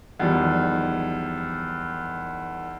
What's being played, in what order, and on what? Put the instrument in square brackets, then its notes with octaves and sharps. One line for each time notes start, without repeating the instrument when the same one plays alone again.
[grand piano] E2 D#3 F3 G3